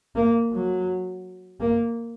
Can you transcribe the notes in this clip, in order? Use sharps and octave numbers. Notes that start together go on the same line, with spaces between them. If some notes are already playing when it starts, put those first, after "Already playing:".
A#3
F#3
A#3